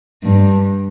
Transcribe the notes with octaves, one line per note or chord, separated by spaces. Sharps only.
G2